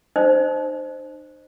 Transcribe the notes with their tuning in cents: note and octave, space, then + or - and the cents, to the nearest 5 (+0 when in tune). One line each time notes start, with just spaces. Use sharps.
D#4 -40 C5 +0 D#5 -30